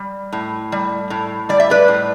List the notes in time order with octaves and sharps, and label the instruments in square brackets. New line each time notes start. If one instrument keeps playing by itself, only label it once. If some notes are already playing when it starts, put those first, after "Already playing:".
Already playing: [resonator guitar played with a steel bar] G3
A2
G3
A2
G3 D5
E5
B4 D5
A2